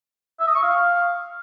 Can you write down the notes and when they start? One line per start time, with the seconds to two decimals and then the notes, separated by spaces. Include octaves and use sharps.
0.40 E5
0.48 D#6
0.55 C#6
0.63 F5